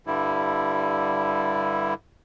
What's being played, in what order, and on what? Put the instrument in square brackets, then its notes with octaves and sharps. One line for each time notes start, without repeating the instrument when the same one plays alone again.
[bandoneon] G2 D3 G3 E4